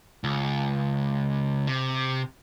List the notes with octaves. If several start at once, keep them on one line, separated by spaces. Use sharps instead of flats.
C#2
C3